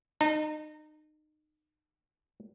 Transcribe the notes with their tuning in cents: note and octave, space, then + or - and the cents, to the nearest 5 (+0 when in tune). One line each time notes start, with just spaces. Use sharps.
D#4 -30 A5 +45